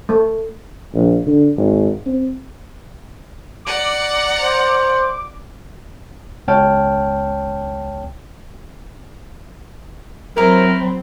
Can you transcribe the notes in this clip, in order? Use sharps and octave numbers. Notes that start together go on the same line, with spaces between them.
A3
A#1
D3
G#1
C4
D5 F#5 A#5 D6
C5
C#2 B3 C#5 G5 A5 F6
F#3 C4 E4 A#4 B4 A#5